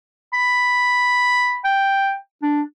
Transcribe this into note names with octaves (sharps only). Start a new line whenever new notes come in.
B5
G5
D4